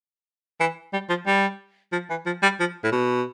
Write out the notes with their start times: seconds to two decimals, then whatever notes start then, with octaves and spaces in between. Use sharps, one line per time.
0.60 E3
0.93 G3
1.09 F3
1.27 G3
1.92 F3
2.10 E3
2.26 F3
2.43 G3
2.60 F3
2.84 A2
2.92 B2